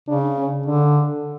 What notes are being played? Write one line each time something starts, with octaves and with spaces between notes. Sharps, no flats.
C#3 D4
C#4
D3 D4